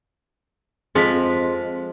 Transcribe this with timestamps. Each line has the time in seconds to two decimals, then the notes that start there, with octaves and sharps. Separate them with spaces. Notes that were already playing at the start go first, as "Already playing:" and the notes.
0.95 F2 F3 G#3 G#4 B6